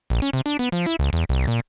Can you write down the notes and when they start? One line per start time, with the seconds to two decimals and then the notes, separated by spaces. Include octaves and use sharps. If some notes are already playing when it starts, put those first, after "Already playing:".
0.10 A#1
0.22 C#4
0.33 C3
0.46 D4
0.59 B3
0.72 F3
0.87 E4
0.99 C#2
1.13 E2
1.29 C2
1.47 A#2